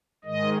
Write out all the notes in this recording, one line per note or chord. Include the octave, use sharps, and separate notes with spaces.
G#2 D#3 G#3 D#5